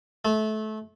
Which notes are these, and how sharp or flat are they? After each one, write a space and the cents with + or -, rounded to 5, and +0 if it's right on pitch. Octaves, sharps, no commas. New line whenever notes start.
A3 -25